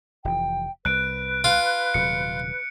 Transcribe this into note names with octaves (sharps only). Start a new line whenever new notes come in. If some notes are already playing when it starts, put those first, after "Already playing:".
F1 E3 G5
C2 B4 F#6 D7
F4
D#1 C3 F#3 C#7